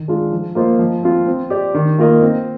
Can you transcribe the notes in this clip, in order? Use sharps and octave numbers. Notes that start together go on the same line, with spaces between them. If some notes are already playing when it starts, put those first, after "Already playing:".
Already playing: D#3
G#3 D4 F4
F3
A#3 F4 C5 D#5
F3
C4 F4
C4
G4 D5
D#3
A#3 F4 A#4 D#5
C4